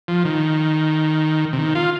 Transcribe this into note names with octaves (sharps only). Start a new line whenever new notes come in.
F3
D#3
C3
D#3
F4